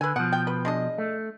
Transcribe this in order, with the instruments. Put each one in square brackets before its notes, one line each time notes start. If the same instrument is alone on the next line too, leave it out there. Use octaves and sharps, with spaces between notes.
[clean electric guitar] D3 [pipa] B4 G#5
[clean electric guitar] B2 F3 [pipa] F#5
[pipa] G5
B4
G#3 D4 D#5
[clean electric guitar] A3